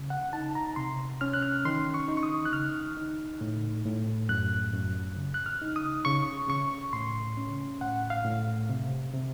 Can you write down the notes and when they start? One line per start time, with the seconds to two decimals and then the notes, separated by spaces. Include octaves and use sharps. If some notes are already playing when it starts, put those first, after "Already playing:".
Already playing: C#3
0.10 F#5
0.33 D#4 A5
0.55 A#5
0.76 C3 C6
1.21 C#4 F6
1.34 F#6
1.43 F6
1.65 D#3 C6
1.94 C#6
2.08 D#4
2.17 C#6
2.23 D#6
2.45 F#6
2.52 C#3 F6
2.97 D#4
3.41 A2
3.85 A2
4.29 F#2 F#6
4.73 F#2
5.16 C#3
5.34 F#6
5.46 F6
5.62 D#4
5.76 D#6
6.05 C#3 C#6
6.48 C#3 C#6
6.93 A2 C6
7.37 C#4
7.81 A2 F#5
8.10 F5
8.25 A2
8.69 C3
9.13 C3